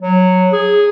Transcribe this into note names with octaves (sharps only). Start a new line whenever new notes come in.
F#3
G#4